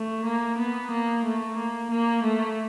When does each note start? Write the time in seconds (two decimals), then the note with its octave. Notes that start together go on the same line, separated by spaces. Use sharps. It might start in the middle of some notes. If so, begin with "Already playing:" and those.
Already playing: A3
0.25 A#3
0.58 B3
0.91 A#3
1.25 A3
1.57 A#3
1.91 A#3
2.24 A3